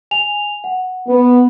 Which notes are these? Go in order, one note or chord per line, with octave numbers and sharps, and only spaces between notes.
G#5 F7
F#5
B3